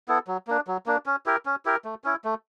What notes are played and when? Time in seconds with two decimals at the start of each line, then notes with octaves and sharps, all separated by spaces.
0.08 B3 E4 A4
0.27 F#3
0.47 A#3 D4
0.67 F#3
0.86 A#3 D4
1.06 C#4
1.26 E4 G4 A#4
1.46 C#4
1.65 E4 G4 A#4
1.85 A3
2.04 C#4 E4
2.24 A3